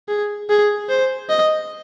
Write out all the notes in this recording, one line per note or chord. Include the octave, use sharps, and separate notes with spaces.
G#4
G#4
C5
D#5